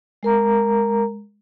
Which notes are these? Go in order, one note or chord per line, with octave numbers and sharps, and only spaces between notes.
G#3 A#4 A#5